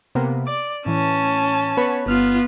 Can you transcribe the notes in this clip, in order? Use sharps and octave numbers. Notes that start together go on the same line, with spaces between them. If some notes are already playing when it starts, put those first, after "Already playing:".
C3 A#3 B3
D5 D6
A2 E3 C#4 A5
B3 B4 C#5
G1 B3 F4 F6